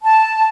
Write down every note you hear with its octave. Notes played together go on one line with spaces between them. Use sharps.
A5